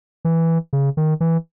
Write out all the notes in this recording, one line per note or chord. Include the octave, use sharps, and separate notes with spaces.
E3
C#3
D#3
E3